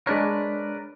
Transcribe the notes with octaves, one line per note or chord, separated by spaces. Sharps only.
G#3 D4 A#4 B4 C#5 D5